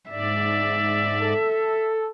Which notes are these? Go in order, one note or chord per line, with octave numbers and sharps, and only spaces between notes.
G#2 D5 E5
A4